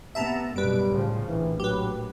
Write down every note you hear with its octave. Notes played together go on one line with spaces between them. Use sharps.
C3 B3 E5 A5 A#5
F#2 B2 G3 B4 D7
C2 A2 C#3 F3
A#1 A2 E3
F#3 G4 B4